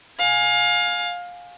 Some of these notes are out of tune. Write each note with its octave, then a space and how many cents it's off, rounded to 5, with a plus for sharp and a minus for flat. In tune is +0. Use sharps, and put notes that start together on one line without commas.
F5 +25 G#5 +5